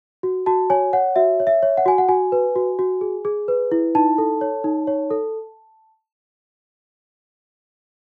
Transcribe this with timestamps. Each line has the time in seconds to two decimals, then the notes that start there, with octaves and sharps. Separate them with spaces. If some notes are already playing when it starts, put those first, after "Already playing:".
0.23 F#4
0.46 F#4 A5
0.70 C#5 G#5
0.93 C#5 F#5
1.16 F#4 E5
1.40 C#5
1.47 E5
1.63 C#5
1.77 F#5
1.86 F#4 G#5
1.98 F#5
2.08 F#4 G#5
2.32 B4
2.56 F#4
2.79 F#4
3.01 G#4
3.25 G#4
3.48 B4
3.72 E4
3.95 D#4 A5
4.18 A4
4.41 C#5
4.64 D#4
4.87 C#5
5.11 A4